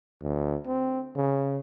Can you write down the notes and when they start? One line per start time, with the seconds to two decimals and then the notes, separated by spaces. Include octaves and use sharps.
0.22 D2
0.67 C4
1.16 C#3